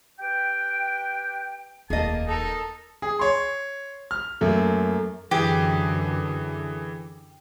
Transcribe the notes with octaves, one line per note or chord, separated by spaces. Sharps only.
G4 B4 G5
D#1 F2 A#3 G#4 D#5 A5
D#4 A4 A#4
G#4
C#5 C6
F6
F#2 A3 A#3
F#2 D3 E3 G4 G#4